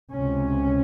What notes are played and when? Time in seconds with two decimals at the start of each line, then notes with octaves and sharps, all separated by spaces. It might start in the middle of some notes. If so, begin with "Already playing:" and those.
0.12 C#2 C3 C#4